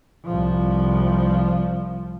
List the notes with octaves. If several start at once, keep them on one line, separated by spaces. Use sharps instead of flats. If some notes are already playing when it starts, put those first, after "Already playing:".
C2 F3